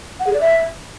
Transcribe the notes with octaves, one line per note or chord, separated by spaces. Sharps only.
F#5
G#4
D5
E5